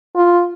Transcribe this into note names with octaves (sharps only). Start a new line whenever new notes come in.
F4